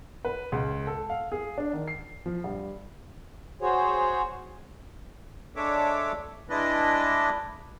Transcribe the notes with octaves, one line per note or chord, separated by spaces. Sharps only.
B4
C#2
A4
F5
G#4
D4
D#3
C7
F3
G2
F#4 G#4 C5 C#5
G#3 D4 A4 C#5 E5 D6
G#3 D4 E4 B4 D5 D#5